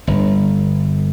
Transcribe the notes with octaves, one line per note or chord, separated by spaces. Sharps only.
G1